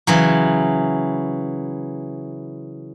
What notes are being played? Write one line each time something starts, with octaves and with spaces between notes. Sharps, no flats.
C#3 E3 F#3